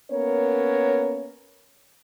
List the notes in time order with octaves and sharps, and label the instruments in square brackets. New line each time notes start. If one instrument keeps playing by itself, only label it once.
[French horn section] A#3 B3 C#4 A#4 C#5